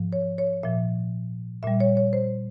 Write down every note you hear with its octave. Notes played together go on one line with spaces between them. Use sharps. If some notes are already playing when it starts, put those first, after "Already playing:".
Already playing: G#2 F3
C#5
C#5
A#2 F3 E5
A#2 G3 E5
C#5
C#5
C5